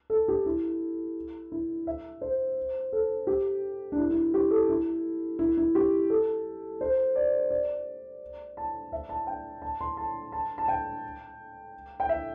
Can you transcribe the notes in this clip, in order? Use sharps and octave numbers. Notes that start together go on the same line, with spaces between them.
A4
G4
E4
E4
E5
C5
A4
G4
D4
E4
E4
G4
A4
E4
E4
E4
G4
A4
C5
D5
D5
A5
E5
A5
G5
A5
C6
A5
A5
A5
G5
G5
E5